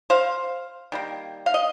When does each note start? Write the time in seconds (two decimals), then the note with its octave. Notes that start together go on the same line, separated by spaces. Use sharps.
0.10 C5 F5
0.92 D#3 G3 A#3
1.46 F5
1.54 D#5